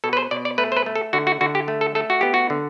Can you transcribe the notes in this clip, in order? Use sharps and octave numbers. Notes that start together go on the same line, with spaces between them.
B2 A4
B4
C5
B2 D5
D5
A3 B4
C5
B4
A3
A4
D3 F#4
F#4
D3 F#4
G4
A3
A4
A3 A4
F#4
B3 G4
F#4
D3